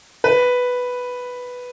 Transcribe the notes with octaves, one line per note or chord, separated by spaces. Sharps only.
B4